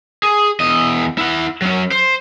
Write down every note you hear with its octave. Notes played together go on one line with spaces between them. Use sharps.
G#4
E2 D#5
E4 F#5
F#3 C#4
C5